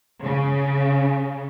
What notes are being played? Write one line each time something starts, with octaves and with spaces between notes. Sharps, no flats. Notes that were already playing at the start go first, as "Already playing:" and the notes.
C#3